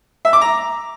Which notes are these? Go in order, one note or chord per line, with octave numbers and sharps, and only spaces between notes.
E5
D6
A#5